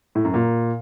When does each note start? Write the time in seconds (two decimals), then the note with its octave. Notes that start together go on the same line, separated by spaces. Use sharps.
0.15 A2
0.25 F#2
0.34 A#2